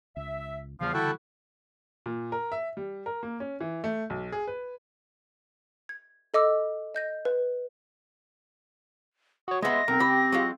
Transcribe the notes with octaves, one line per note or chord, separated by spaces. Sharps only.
C#2 E5
E2 C#3 E3 F3 G3 F5
D3 E4 F#4 A4 G5 A5
A#2
A#4
E5
G3
A#4
A#3
C#4
E3
A3
B1
G#4
B4
G#6
A4 D#5 D6 E6
D#5 G6 A#6
B4
F#4 C#5 D#6
G#3 B3 D#5 E5 C6 A#6
B1 C4 A#4
C#2 G4 B5
F#3 G#3 F4